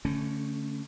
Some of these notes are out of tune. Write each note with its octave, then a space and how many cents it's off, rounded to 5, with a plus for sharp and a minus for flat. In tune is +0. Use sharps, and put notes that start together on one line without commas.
D3 -25 A3 +0 C#4 +0